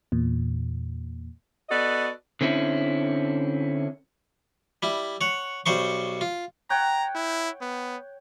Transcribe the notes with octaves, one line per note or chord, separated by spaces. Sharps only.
E2 A#2
B3 F#4 A4 D5 D#5
D3 C4 C#4 E4
G3 E4
C#5 F#5
B1 G3 C5 C#6
F4
C#5 F#5 G5 A#5
E4
B3